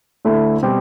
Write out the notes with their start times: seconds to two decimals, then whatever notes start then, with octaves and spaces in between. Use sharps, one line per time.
0.25 D2 D3 A3 E4
0.62 B2 G3 C4 G4